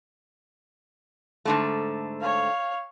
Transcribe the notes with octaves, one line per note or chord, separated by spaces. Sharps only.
G#2 D3 A3
C#5 F5